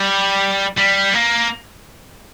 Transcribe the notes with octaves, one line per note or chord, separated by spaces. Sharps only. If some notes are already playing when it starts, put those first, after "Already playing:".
Already playing: G3
G3
A#3